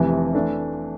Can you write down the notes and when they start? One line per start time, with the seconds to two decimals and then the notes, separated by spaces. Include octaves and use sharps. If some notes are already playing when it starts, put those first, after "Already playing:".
Already playing: F1 F2 C3 E3
0.34 E3 A3 D4